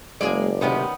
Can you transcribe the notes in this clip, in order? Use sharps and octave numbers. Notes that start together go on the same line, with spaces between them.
F#1 G#3 A#3 G#4 D5
D2 C3 D#3 B3 C#4 G4